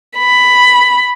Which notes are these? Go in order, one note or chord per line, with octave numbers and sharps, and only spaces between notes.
B5